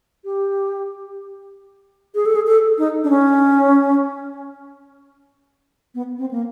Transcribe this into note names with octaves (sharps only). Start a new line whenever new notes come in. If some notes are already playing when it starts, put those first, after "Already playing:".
G4
G#4
A4
G#4
A4
D#4
D4
C#4
B3
C4
A#3